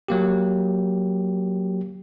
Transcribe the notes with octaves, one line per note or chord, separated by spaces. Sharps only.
F#3 A#3 G4